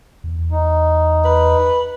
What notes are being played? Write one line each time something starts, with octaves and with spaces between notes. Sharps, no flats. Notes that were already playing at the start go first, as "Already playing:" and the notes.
E2
D#4
B4